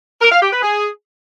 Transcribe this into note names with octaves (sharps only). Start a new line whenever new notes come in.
A#4
F5
G4
B4
G#4